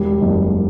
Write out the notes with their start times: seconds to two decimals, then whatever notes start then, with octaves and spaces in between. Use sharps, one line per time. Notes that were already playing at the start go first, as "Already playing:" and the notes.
Already playing: E1 G3
0.21 F#1